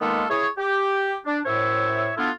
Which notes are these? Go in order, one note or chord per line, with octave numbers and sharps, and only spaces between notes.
D#3 G#3 A#3 B3 F4 A4
E4 G#4 C#5
G4
D4
F#2 A2 C5 C#5 E5
A3 B3 D4 E4 F4